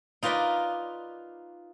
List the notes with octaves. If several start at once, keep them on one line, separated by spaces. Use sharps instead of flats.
D#4 F4 A#4 B4 D5